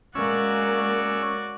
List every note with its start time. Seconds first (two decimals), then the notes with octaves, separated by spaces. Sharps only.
0.15 G#3 A#3 C#4 F#4 D5 E6